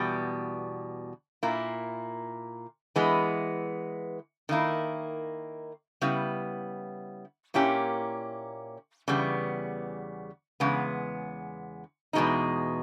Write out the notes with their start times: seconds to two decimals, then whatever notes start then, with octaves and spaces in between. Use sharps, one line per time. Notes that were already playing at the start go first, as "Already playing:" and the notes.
Already playing: E2 B2 G3
1.43 A#2 A#3 E4
2.96 E3 G#3 B3
4.49 D#3 A#3 E4
6.01 C#3 G3 B3 E4
7.54 A#2 A#3 C#4 E4 G4
9.08 E2 C#3 G3 B3
10.60 E2 C#3 G#3 B3
12.13 E2 B2 G#3 D#4